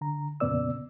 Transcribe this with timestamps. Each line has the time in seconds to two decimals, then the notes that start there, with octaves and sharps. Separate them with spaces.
0.01 D3 A#5
0.40 F2 A#2 C#3 B3 D5 E6